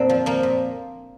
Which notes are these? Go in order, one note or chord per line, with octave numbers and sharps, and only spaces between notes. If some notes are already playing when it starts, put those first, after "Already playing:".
Already playing: F2 A#2 A#3 C4 D4
F3
F3 A#3
A#2